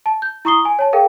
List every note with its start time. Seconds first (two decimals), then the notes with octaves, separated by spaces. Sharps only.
0.06 A5
0.22 G6
0.45 E4 A#5 C#6 D#6 C7 G7
0.65 G#5
0.79 C#5 A5
0.93 G#4 A#4 F5 G5